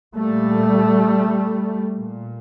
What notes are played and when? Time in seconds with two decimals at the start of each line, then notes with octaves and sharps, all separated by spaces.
0.16 A#2 G3 A3
1.97 A#2